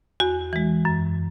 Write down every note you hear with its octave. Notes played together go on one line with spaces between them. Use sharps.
E2 F#4
E3 G#3
F#2